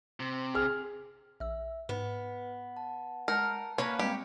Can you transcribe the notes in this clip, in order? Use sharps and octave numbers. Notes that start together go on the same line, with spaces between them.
C3
G#4 F6
A#1 E5 E6
G#2 B3 B4
A5
G#3 A#4 F#5 A5 G6 C#7
A#3 C#4 B4 C#5 B5 F6 F#6
G3 G#3 C4 G4 C#7